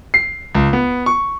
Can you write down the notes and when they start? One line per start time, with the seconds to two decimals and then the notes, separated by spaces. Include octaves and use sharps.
0.14 C7
0.55 C#2
0.73 B3
1.06 C#6